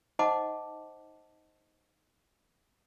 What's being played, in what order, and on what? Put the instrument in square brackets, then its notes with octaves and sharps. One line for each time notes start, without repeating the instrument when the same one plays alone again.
[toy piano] D#4 C5 D#5 F#5 A5 D6